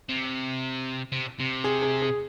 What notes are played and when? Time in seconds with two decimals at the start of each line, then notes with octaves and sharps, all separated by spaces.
0.09 C3
1.12 C3
1.40 C3
1.64 G#4
1.82 G#4
2.02 G#4